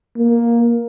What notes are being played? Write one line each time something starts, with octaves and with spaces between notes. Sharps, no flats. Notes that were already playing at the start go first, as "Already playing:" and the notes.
A#3